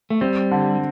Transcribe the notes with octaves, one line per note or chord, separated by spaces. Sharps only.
A3
G3 C4
D3